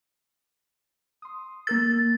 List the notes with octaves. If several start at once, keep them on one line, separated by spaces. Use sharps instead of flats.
C6 D#6
A#3 A#4 E6 A6